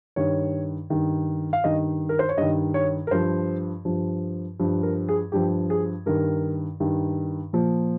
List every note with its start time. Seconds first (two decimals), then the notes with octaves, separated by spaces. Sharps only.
0.16 G2 D#3 C#5
0.90 G2 D#3
1.53 F5
1.64 G2 D#3 D#5
2.09 A#4
2.19 C5
2.29 C#5
2.37 G2 D#3 D#5
2.74 C#5
3.07 A#4
3.11 G2 F3 C5
3.85 G2 F3
4.59 G2 F3
4.83 A#4
5.09 G#4
5.32 G2 F3 G4
5.70 G#4
6.06 G2 D#3 A#4
6.80 G2 D#3
7.53 A#2 F3